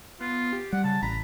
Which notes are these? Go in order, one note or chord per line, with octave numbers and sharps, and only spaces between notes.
B3 F4
G4
G3 F#5
C#3 A5
A1 A#5 B5